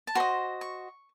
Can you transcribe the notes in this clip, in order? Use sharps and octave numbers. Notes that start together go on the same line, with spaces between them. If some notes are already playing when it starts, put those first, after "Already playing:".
A5
F#4 C5 D#5 C6
C#6